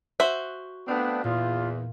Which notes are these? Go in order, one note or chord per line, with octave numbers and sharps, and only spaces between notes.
F#4 C5 E5
A3 B3 C4 D4 F5
E2 A#2 F4